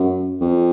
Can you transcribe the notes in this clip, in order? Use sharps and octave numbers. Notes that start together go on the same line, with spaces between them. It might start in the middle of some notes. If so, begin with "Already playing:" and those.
Already playing: F#2
F2